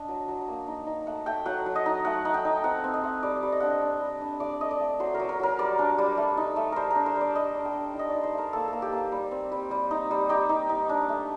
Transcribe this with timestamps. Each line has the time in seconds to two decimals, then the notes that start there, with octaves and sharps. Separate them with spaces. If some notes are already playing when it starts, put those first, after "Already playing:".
Already playing: D4 D#5
0.08 F#3
0.28 F#3
0.48 A#3
0.68 D#4
0.87 D#4
1.07 A3 F#5
1.26 A3 G5
1.46 F#3 F#5
1.66 F#3
1.76 D#5
1.86 D#4
2.05 A3 F#5
2.25 D#4
2.34 G5
2.45 D#4
2.64 C4 F#5
2.84 C4
2.94 D#5
3.04 A3
3.23 G3 D5
3.43 G3
3.52 D#5
3.60 D4 F#5
3.70 D#5
3.81 D4
4.01 G3
4.21 D4
4.40 A3 D5
4.60 A3 D#5
4.71 D5
4.80 A3
5.00 F#3 C5
5.15 A#4
5.20 F#3
5.29 A#4
5.40 F#3 A#4
5.59 G3 D5
5.79 D4
5.98 G3
6.17 A3
6.37 D#4
6.56 A3
6.72 G3 A#4 C5
6.91 A#4
6.96 D4
7.06 C5
7.16 G3
7.21 D5
7.35 G3 D#5
7.55 D4
7.65 G5
7.75 D4
7.94 D#4
7.99 D#5
8.09 D#4 D5
8.23 C5
8.34 A3 A#4
8.53 A#3 A4
8.68 A#3 A4
8.82 G4
8.93 A#3
9.12 G3
9.31 C4
9.52 G3
9.71 G3
9.91 D#4
10.11 G3
10.29 D#4 G4
10.49 D#4
10.69 D#4
10.89 D4
11.09 A3